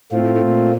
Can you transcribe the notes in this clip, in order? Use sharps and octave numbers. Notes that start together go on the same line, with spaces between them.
A2 A3 C4 F4
A2
A2
A#2